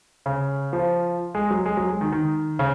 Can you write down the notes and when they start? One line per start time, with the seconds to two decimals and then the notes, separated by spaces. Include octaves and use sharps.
0.26 C#3
0.73 F3
1.35 G#3
1.50 F#3
1.66 G#3
1.77 F#3
1.89 G#3
2.01 D#3
2.12 D#3
2.59 C#3